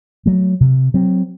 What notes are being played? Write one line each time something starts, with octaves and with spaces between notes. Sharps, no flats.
F#3 A3
C3
F#3 C4